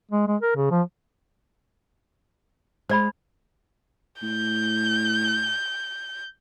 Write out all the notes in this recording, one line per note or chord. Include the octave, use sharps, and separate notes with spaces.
G#3
G#3
A#4
C#3
F3
G#3 C5 D5 B5
A2 G6